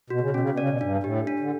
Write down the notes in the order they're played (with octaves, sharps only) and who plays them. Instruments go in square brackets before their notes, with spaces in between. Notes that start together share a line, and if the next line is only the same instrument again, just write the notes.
[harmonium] B2 [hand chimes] F#4
[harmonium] C#3
[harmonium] B2 [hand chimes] C#4
[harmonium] C#3
B2
[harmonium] C#3 [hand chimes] D5
[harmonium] B2
[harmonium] G2 [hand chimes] D4
[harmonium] A2 [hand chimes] G4
[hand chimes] D4
[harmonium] D3